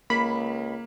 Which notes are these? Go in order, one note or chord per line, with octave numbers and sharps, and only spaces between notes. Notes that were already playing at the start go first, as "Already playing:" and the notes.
C#2 A#3 B5